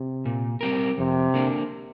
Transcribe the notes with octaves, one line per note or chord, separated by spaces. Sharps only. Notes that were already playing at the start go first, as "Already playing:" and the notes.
Already playing: C3
A#2
G3 C4 G4 A#4
F2 C3
D3 A#3 D4